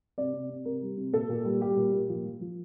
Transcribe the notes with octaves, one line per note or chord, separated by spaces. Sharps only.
C3 D5
C3
C3
C3 A#4
G3
C3
A#2 A4
A#2
G3
G3 G4
A#2
A#2
F3
F3
F3